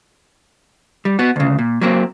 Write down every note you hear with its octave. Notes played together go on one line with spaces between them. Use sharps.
G3
B3 F#4
D2 C#3
A#2
F#3 A#3 C4